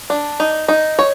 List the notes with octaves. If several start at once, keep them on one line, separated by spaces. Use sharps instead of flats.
D4
D#4
D#4
C#5